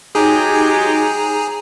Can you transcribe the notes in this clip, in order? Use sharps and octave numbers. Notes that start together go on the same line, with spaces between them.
F#3 G#3 D#4 G4 G#4 G#5 A#5